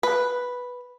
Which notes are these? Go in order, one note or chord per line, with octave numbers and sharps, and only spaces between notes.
B4